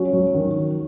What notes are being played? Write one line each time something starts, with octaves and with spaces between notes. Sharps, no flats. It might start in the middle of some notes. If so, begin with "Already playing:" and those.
Already playing: F#3 C#4 F#4
F#3
D#3